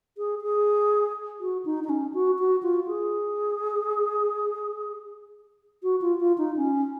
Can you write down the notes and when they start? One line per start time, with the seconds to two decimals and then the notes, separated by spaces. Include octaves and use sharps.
0.18 G#4
0.42 G#4
1.40 F#4
1.65 D#4
1.84 D#4
1.89 C#4
2.14 F#4
2.39 F#4
2.63 F4
2.88 G#4
5.83 F#4
6.01 F4
6.20 F4
6.38 D#4
6.56 C#4